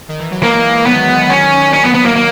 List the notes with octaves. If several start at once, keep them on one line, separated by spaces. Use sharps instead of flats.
D#3
E3
F#3
E3 G#3 A#3
G#3
D#3 F#3 B3
G#3
D#3 F#3 C#4
C#4
B3
B3
A#3
A#3